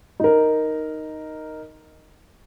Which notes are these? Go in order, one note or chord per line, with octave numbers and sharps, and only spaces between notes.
D#4 A#4